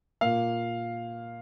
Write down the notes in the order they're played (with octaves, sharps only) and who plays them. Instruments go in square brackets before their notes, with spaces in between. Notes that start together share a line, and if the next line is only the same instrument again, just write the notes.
[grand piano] A#2 A#3 F5